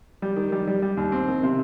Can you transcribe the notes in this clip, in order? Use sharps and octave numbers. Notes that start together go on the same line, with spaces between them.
G3
D#3
G3
G3
G3
D#2
C4
D#3
C3